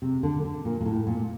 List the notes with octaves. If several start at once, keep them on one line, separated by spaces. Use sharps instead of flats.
C3
D3
D3
A#2
A#2
A2
A#2